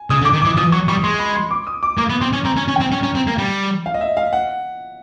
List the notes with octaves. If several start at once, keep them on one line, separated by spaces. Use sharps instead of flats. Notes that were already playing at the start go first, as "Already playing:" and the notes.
Already playing: G#5
C#3 D#6
D3
D6
D#3
E3 D6
F3 D#6
F#3 C#6
G3 C#6
G#3 C6
B5
C6
D6
D#6
D6
A#3 D6
B3
C4 C6
C#4
C4 A#5
C#4
C#4
C4 G5
C#4
C#4
C4
A#3
G3
F5
D#5
E5
F5
F#5